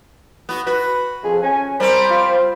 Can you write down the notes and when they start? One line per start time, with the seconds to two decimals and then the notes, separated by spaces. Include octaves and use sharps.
0.49 B3 F#4
0.67 F#4 B4
1.24 F2 F3 G#4
1.43 C#4 G#5
1.80 G3 C4 A#4 C5 B5
2.10 F4